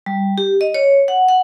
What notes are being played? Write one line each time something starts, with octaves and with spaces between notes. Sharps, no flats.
G3
G4
D#5
C#5
F#5
F#5